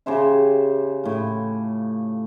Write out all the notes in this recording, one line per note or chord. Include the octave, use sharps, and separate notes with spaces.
C#3 G4 C5 E5
A2 F4